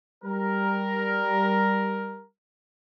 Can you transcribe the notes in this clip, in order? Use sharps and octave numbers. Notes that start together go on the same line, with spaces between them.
G3 A#4